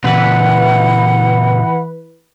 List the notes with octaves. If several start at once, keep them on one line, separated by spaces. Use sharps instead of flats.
A#2 C#3 E3 B4 F#5